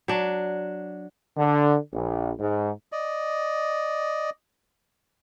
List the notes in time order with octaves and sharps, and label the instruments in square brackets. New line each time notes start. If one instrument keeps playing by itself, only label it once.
[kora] F#3 D4
[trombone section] D3
A#1
G#2
[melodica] D5 D#5